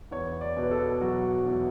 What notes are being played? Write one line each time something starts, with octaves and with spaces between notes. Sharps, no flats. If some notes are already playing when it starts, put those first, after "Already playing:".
E2 C#5
D5
B2
B4
A4
F#3 F#4
E2